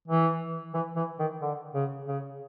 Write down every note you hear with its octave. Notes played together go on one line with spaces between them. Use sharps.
E3
E3
E3
D#3
D3
C#3
C#3